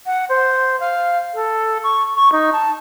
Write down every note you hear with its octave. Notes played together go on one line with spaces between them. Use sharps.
F#5
C5
F5
A4
C#6
C#6
D#4
A5